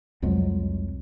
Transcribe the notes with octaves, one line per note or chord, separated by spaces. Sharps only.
C2 F2 F#3 G#3